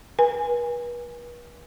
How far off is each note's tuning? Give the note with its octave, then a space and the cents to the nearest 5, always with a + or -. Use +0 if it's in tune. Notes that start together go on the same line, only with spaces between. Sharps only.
B4 -40 G#5 +0